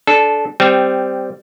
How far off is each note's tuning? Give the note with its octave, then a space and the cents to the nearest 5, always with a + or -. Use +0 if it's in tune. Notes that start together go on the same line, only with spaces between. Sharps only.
D4 +0 A4 -15
G3 +0 C4 -15